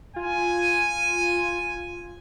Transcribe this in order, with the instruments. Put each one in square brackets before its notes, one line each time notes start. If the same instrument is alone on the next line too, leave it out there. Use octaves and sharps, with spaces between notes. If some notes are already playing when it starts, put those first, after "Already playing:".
[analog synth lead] F4 [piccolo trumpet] G#5